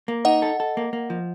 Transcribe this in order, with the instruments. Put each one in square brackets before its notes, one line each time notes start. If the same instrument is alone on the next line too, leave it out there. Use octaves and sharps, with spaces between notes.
[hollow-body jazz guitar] A#3
[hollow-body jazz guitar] D#4 [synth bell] D#5 F#5
[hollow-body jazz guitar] A4
A4
A#3
A#3
F3